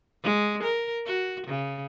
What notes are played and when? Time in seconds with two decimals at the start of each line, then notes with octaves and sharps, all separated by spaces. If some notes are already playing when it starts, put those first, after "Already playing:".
0.23 G#3
0.63 A#4
1.06 F#4
1.47 C#3